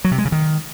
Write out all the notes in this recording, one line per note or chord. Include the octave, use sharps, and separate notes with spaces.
F#3
C3
G#3
C#3
D#3